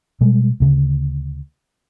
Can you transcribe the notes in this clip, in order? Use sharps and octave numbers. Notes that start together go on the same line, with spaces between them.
B2 G3 G#3
D2 C#3